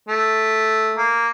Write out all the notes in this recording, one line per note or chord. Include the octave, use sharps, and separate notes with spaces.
A3
A#3